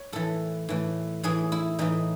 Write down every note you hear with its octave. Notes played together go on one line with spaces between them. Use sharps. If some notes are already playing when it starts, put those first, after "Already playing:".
Already playing: C#5
A2 E3 A4
A2 E3
A2 E3 G#4
E4
A2 E3 D#4